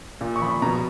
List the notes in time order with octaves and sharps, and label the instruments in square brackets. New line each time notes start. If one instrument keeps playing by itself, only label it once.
[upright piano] A#2
C#6
F3 B5
B2 A#5